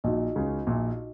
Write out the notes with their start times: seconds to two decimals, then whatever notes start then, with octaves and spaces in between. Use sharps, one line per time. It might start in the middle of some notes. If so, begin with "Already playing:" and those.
0.04 A#1 A#2 D#4 F#4 D#5
0.36 C#2 C#3
0.67 A#1 A#2